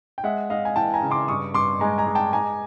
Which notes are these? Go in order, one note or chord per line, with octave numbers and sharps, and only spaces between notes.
G5
G#3 E5 F#5
G#3 D#5 F5
G#5
E3 G5 A5
G#5 A#5
C#3
C6 D6
G2 C#6 D#6
G2 C6 D6
G#3 G#5 A#5
G#5 A#5
G#3
G5 A5
G#3 G#5 A#5